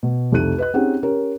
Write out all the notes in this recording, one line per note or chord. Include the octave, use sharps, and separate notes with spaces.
B2
C2 F2 A3 D#4 F#6 D#7
B4 D#5 F#6
C4 C#4 D#4 G4 G#4 F#5
C#4 G4 A#4 C#5